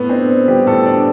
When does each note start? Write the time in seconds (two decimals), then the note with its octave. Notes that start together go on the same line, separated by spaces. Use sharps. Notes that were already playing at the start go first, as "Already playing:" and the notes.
Already playing: A2 B3
0.09 C4 D4
0.29 B3
0.48 G3 G4
0.66 A2 A4
0.86 D4